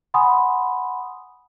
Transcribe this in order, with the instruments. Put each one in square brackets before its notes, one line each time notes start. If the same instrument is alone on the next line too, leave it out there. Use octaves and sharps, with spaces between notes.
[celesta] F#5 G#5 B5 C6 D#6